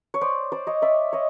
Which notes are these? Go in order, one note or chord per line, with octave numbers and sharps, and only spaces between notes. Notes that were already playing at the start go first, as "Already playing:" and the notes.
C#5
C5 D5
C5 D5
C#5 D#5
D5 E5
C#5 D#5